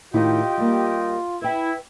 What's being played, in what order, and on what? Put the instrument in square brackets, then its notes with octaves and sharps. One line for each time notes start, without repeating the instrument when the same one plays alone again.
[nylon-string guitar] A2 D#3 E4 [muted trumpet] F4 [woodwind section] G4 D#5 G5
[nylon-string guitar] G3 A#3
[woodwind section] E4 [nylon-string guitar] B4 G5